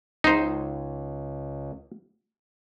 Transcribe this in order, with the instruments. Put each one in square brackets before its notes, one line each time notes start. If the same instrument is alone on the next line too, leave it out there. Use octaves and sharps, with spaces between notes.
[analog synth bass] C#2 [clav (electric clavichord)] D#4 C5